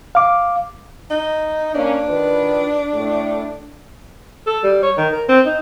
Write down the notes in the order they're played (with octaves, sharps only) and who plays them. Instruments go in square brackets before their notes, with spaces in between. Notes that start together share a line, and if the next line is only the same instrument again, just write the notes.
[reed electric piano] F5 D6
[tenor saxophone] D#4
[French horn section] A#3 C#4 [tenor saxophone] D4
[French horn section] D#3 F4 B4
A2 A3
[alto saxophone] A4
G3
C#5
D#3
A#4
C4
D#4